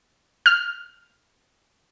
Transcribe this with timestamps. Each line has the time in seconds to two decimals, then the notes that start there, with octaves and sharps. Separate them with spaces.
0.46 F6